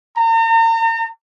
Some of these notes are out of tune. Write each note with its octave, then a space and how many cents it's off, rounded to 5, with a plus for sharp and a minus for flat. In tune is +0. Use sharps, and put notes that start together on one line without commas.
A#5 -40